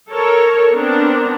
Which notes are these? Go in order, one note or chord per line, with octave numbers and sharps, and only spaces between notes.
A4 A#4 C#5
B3 C4 D4 A#4